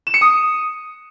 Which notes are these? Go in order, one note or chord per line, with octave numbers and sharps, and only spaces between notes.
E7
C#7
D#6